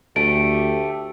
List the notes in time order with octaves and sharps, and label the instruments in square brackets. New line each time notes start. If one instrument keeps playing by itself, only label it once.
[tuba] D2 [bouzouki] A3 [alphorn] G4 [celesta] D7